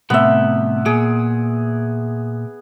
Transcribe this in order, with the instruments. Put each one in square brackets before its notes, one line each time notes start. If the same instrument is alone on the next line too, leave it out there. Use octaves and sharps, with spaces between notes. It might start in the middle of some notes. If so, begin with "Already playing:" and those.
[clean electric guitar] A2 C3 G3 [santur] B3 E5
[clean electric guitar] A#2 [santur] G#4